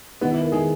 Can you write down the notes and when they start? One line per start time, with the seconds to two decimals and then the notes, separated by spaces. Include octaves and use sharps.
0.21 D#3 G#3 B3 D#4
0.32 E4
0.41 A#4
0.52 D#3 G#3 D#4 G#4